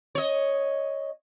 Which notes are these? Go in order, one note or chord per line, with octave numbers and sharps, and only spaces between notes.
C#5 D#5